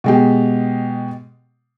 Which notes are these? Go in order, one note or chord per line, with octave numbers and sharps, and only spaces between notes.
B2 G#3 G4